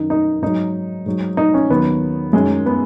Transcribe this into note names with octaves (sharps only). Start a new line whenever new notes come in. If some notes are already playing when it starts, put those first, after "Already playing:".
Already playing: F#2 D#3 F#3 D#4
D#4
G#2 F#3 D#4
G#2 F#3
D#4
C#4
D#2 D#3 F#3 B3
F#2 D#3 F#3 G#3
B3